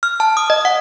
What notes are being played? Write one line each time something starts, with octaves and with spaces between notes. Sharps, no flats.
F6
A5
D#6
D#5
F#5